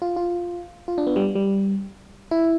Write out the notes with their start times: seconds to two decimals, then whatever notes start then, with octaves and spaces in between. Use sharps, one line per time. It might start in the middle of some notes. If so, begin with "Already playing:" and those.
0.02 F4
0.16 F4
0.88 F4
0.98 D4
1.07 B3
1.16 G3
1.35 G3
2.31 E4